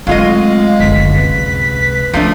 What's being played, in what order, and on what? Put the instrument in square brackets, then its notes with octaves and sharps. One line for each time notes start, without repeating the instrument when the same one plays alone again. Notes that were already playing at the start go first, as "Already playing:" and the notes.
[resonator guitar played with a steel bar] F#3 F4 D#5 [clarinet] G#3 [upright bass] A3 C4 [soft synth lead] F5
[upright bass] F#1 D2 [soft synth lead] B6
[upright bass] C#2 C3 [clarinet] B4
[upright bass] C#2 [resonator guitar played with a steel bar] F3 A3 D4